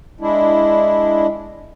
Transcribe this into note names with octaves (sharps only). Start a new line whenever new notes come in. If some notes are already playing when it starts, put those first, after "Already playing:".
G#3 D4 E4